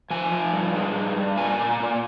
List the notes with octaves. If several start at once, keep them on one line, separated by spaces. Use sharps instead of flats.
F3 G#5
F3
G2
G#3
G2
G2
A#2 G#5
A#2
A#2